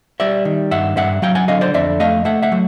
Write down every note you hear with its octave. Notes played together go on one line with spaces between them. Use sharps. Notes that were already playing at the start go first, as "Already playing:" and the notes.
G3 D5 E5
D#3
G2 E5 F#5
G2 E5 F#5
F#3 F5 G5
F#5 G#5
D3 D#5 F5
C5 D5
F2 D5 E5
A3 D#5 F5
A3 E5 F#5
E5 F#5
F#3